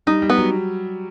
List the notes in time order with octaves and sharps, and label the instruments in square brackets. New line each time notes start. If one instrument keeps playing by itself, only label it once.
[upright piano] G3 [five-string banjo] D#4
[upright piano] G3
[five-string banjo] B3
[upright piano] F#3